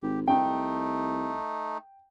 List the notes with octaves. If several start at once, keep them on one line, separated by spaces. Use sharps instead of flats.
G#1 G4
C2 A3 D#4 G5